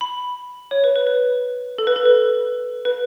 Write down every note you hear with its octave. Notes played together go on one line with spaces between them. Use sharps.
B5
C#5
B4
B4
B4
A4
B4
A4
B4
B4